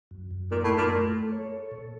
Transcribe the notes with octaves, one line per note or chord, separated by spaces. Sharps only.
F#2
F#2
A#2 D#4
A2
F#2
A#2
A3
A4
C#5
A4
A#2